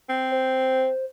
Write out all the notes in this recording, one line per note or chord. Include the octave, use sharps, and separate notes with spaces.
C4
C5